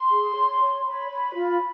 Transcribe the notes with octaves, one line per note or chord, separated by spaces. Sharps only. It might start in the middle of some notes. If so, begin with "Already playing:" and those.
Already playing: C6
G#4
C#5
C#5
C#5 B5
C#5
F4